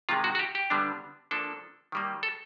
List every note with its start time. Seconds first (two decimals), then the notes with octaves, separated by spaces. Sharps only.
0.09 C3 D#3 G#3 F4
0.24 F#4
0.35 F#4
0.39 G4
0.55 G4
0.70 D3 G3 B3 D4
1.31 F3 A#3 D4 A4
1.92 D#3 G3 A#3
2.23 A4